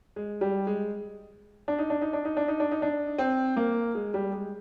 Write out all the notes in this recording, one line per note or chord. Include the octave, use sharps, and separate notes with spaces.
G#3
G3
G#3
D4
D#4
D4
D#4
D4
D#4
D4
D#4
D4
D#4
D4
C4
A#3
G#3
G3
G#3